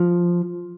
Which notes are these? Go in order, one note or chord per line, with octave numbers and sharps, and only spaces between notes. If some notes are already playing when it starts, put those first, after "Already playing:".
Already playing: F3